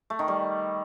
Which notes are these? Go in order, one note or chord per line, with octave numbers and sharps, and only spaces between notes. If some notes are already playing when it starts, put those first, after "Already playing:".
A3
D#3
G3